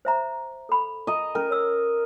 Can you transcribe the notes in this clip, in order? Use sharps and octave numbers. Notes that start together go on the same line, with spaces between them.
C5 E5 A#5
A4 B5
D#5 A#5
C#4 A#4
C#5 E6